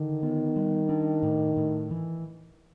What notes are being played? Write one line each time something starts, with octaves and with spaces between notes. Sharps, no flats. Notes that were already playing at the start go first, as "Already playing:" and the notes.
Already playing: D3 D#3
B3
G3
D4
A2
A2
E3